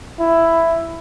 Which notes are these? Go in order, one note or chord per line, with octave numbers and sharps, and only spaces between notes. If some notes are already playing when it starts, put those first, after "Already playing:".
E4